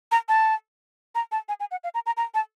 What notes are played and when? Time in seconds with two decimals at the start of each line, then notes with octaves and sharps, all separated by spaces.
0.12 A#5
0.29 A5
1.15 A#5
1.32 A5
1.49 G#5
1.60 G#5
1.71 F#5
1.84 F5
1.94 A#5
2.06 A#5
2.17 A#5
2.34 A5